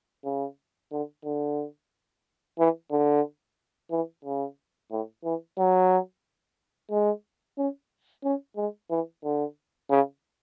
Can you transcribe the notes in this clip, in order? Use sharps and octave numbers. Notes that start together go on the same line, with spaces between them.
C#3
D3
D3
E3
D3
E3
C#3
A2
E3
F#3
G#3
C#4
C#4
G#3
E3
D3
C#3